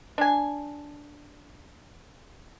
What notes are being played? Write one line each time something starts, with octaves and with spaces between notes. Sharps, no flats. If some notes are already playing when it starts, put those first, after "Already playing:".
D4 G#5